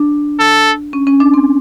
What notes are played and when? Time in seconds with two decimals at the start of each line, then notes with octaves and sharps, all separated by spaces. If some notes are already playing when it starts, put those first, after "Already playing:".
Already playing: D4
0.39 A4
0.93 C#4
1.07 C#4
1.20 D4
1.34 C4